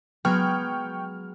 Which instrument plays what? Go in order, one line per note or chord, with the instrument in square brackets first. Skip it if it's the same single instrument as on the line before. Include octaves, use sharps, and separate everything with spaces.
[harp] F#3 G#3 G#6 [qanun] B3 [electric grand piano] G5 C#6 F6